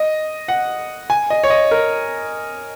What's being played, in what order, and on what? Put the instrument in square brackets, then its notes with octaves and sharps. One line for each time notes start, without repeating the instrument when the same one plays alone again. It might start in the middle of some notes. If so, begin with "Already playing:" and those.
Already playing: [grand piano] D#5
F#5
G#5
D#5
C#5
D#5
A#4